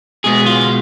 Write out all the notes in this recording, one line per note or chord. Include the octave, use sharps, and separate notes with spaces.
B2 G#3 B3 G#4
F4